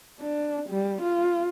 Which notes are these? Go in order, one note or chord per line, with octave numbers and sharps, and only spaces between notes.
D4
G3
F4